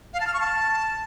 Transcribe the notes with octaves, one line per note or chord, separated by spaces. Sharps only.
F5
A5
F6
C#6
A5